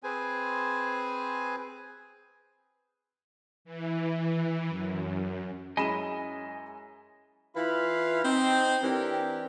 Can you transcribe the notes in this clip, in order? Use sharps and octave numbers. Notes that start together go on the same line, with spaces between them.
C4 G#4 B4 C5 G#5
E3
F#2
F#2 G#3 C#4 E4 D#5 G#5 B5 E7
E3 E4 F4 B4 F5 B5
C4 D#4
E3 C4 D4 G4 A#4